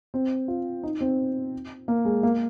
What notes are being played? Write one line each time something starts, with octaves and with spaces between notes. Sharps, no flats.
C4
F4
D#4
C4
A#3
G#3
A#3